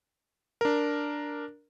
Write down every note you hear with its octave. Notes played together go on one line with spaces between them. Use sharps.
D4 A#4